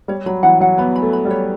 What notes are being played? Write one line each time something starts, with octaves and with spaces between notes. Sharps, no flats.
G3 C#5
F#3 B5
E3 F#5
F#3 F#5
B3 B5
B5
A3
B5
G3
C#5